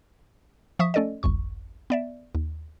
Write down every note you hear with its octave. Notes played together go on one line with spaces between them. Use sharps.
F3 E5 C#6 D#6 B6
A3 C#4 A4 D5 D#5
G1 C2 F2 C#6
B3 D5 E5
D#2